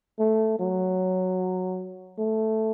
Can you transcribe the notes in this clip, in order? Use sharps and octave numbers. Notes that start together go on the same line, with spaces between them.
A3
F#3
A3